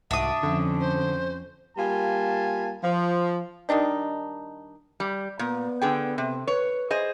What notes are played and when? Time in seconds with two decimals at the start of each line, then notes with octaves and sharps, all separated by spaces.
0.11 C2 G#2 D4 F#4 E5 D#6
0.43 F2 D3 C#4
0.80 C5
1.77 G3 A#3 F4 G#5 A5
2.83 F3
3.69 D#3 G3 D4 D#4
5.00 G3
5.39 A#2 B3
5.82 D3 G#4 G5
6.18 C3
6.47 B4 C#5
6.90 G#4 C5 D#5